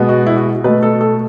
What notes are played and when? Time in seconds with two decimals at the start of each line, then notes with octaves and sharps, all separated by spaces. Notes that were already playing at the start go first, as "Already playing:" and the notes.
Already playing: B2 G#3 B3
0.09 F#4
0.26 E4
0.36 F#4
0.64 B2 A3 B4
0.83 A4
1.01 A4